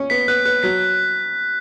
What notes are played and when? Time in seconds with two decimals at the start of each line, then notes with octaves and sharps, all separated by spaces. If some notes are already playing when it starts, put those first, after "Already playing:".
Already playing: C#4
0.10 B3 B6
0.28 B3 F#6
0.45 B3 F#6
0.63 F#3 B6